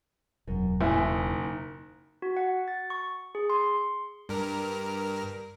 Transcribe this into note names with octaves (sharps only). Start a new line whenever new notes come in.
E1 F#2
F#1 A2 E4 G#5
D#4
F#4
F#5
A6
C#6
G#4
C6
G2 A#4